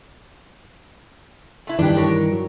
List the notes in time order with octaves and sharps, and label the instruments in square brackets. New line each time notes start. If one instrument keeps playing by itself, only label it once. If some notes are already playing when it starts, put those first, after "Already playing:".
[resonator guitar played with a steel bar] A3 E4
[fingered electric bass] G2 D#3 E3 [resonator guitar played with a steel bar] D4 G4
[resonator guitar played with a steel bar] A#4 C#5
[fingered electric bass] F#3